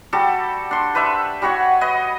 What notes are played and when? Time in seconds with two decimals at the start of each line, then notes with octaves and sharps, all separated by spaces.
0.13 G3 F#4 G4 A4
0.71 D4 C6
0.95 B4 C5 D5 E5
1.42 G3 F#4 C#5 F#5
1.81 B4 D#5